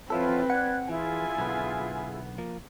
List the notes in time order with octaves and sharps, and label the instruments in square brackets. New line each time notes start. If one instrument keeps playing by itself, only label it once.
[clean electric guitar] F3 E4 A4 [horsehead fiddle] C4 B4 [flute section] F4 C#5 F#5
[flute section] D5 F#6 G#6 [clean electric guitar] F#5
[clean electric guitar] E3 [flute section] E4 F4 G#4 [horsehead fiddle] G#5
[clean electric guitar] B1 D3 B3
F3 A#3